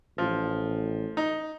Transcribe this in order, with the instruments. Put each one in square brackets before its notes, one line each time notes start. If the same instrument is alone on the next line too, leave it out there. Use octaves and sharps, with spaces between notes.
[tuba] A1 [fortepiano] F3
[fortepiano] D#4